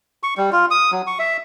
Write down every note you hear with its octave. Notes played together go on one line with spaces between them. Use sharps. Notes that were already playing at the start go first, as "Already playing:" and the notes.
C#6
G3
F4
D#6
F#3
C#6
E5